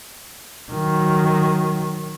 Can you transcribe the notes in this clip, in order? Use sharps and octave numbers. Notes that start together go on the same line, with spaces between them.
D#3 F#3